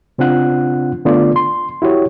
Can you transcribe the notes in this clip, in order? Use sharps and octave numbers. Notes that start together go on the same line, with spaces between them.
C#3 C4 D4 F4 F#5 F#6
D3 A3 B3 D4 F4 D5
C6
E4 F#4 G4 C#5